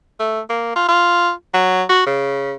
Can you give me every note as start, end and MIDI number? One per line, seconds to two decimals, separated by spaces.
0.20 0.40 57
0.49 0.71 58
0.76 0.86 65
0.88 1.31 65
1.54 1.83 54
1.89 2.04 66
2.07 2.54 49